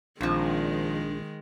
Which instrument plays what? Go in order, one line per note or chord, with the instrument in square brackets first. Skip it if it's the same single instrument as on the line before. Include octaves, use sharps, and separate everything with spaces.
[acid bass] A#1 [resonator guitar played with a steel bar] F2 F3 [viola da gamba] D#3 G#3 [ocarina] D4